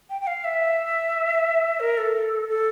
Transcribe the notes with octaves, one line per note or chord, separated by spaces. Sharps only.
G5
G5
F5
E5
A#4
A4
A4